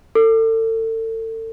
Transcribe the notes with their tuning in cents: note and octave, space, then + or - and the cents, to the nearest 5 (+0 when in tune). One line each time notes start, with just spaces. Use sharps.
A4 +35